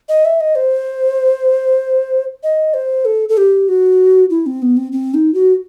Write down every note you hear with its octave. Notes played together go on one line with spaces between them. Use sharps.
D#5
E5
D#5
C5
D#5
C5
A4
A4
G4
F#4
E4
C4
B3
C4
C4
D#4
F#4